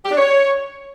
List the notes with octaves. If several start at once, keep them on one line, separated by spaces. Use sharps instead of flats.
G4
D4
C#5